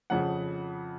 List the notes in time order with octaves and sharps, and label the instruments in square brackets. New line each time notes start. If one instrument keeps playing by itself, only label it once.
[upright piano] F2 C#3 F3 F#5